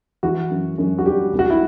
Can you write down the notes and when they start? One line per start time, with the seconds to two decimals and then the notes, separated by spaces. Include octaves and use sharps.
0.23 E3 F#4
0.50 F#2
0.78 F#2
0.98 F#4
1.06 G3 G4
1.33 C2
1.39 F#4
1.50 E4